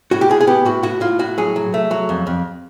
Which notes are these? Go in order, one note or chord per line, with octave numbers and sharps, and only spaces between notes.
A2 F#4
G4
A2 G#4
G#4
B3 G4
A2 F#4
A2 F#4
A2 F4
A2 F#4
F#3 G#4
F#3
A3
F#3
F2
F2